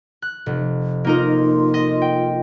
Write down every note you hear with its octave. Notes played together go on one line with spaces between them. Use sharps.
F#6
F1
A#3 D#4 F4 A#4
D#5
G5